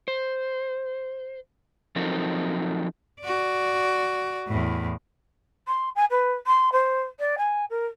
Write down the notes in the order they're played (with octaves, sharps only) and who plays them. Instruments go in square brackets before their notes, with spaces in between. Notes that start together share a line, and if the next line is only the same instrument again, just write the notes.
[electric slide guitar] C5
F3 F#3 C4 D#4 A4 A#4
[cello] F#4 D5
E2 A2
[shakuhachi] C6
G#5
B4
C6
C5
D5
G#5
A#4